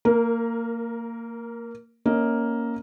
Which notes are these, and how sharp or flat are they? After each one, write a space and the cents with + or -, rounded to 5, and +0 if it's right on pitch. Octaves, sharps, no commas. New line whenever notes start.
A#3 -20 A#4 +10
A#3 +0 C#4 +0 D#5 +15